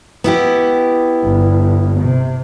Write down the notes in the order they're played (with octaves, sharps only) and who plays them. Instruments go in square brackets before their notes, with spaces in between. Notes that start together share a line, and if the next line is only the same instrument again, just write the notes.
[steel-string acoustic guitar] B3 E4 G4
[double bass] G1
C3